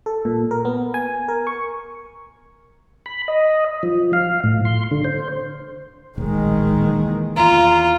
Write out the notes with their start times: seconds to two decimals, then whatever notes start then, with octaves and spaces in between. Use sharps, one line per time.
0.06 A4
0.25 A#2
0.51 A#4
0.65 B3
0.94 G#5
1.28 A#4
1.47 C#6
3.06 B5
3.28 D#5
3.83 F3
4.13 F5
4.44 A2
4.65 C6
4.91 D3
5.04 C5
6.18 D1 A#1 D#3 G#3
6.81 E3 A#3
7.37 E2 F4 A#5